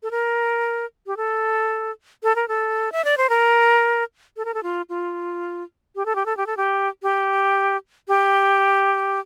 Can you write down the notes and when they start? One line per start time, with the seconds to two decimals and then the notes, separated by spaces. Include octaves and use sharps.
0.03 A4
0.11 A#4
1.07 G4
1.17 A4
2.23 A4
2.36 A#4
2.48 A4
2.92 E5
3.05 D5
3.18 C5
3.29 A#4
4.37 A4
4.45 A#4
4.54 A4
4.63 F4
4.89 F4
5.95 G4
6.06 A4
6.15 G4
6.26 A4
6.37 G4
6.47 A4
6.57 G4
7.03 G4
8.08 G4